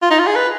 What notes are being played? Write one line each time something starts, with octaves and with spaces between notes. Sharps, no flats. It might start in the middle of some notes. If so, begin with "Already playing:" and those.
F4
D#4
F4
G#4
B4